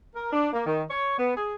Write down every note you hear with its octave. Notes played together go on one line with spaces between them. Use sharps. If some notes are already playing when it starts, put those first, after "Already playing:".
A#4
D4
A#3
D#3
C#5
B3
G#4